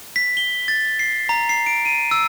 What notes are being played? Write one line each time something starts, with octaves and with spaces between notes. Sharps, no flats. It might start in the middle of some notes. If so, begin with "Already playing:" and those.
B6
G7
A6
C7
A#5
C7
D7
D#7
E6